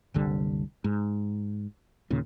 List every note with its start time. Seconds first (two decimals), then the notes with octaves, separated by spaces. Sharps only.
0.14 F#1 C2 D3 G3
0.84 G#2
2.10 D#2 A#2 C#3